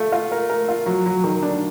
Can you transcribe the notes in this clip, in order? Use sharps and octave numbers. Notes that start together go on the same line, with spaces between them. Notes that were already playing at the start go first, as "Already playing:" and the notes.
Already playing: A3 F4
F4
A#4
A#4
F4
F#3
F#3
D#3
D4